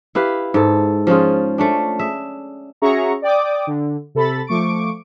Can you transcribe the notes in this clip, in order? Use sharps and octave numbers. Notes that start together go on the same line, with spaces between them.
E4 G4 B4 F5
G#2 A4
F3 C#4 F4 G#4
A3 C#4 D4
G#4 E5
C#4 F#4 G#4 E5 A#5 C#6
D5 G5 D6 D#6
D3
C3 A4 B5 A6
F3 A3 C#6 D6 D7